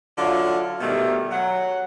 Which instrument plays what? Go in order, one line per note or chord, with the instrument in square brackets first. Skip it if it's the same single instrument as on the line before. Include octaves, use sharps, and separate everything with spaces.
[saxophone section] D3 F#3 E4 F4
B2 D#3 E3 G3 A3 D4
F#3 F#5